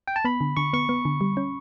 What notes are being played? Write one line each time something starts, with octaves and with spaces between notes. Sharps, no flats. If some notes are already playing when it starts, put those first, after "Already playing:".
G5
A5
B3 B5
D3
D3 C#6
B3 C#6
B3
D3
G3
C#4